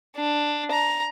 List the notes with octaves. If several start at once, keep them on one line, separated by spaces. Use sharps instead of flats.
D4
A#5